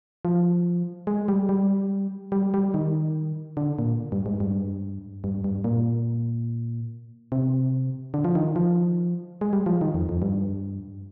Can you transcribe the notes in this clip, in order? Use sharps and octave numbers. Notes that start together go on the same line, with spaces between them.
F3
G#3
G3
G3
G3
G3
D#3
D3
A#2
G2
G#2
G2
G2
G2
A#2
C3
D3
F3
D#3
F3
G#3
G3
F3
D#3
F2
F2
G2